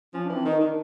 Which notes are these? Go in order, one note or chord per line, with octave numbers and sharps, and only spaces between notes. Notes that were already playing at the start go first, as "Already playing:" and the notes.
F3 C#4
D4
E3 C4
D#3 D#4
D#3 D4